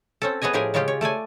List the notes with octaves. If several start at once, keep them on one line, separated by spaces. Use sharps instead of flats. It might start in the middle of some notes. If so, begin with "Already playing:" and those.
C4 C#4 A4
B3 G#4 C#5 D#5 G#5
A2 F3 G4 G#4 A#4 G#5
C#3 G#3 C#4 F4 G4
C#5
A3 A4 D5 G#5